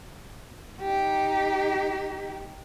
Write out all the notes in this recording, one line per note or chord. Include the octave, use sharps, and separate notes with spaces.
D#4 G4